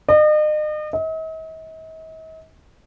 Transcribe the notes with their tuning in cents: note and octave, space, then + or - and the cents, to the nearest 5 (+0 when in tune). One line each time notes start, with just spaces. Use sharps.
D#5 -40
D#5 +45